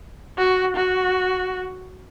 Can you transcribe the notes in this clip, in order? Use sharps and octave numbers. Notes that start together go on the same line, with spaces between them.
F#4
F#4